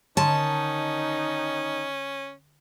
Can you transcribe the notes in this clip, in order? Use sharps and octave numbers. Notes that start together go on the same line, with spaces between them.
D3 D#3 C#4 D#4 A5 C6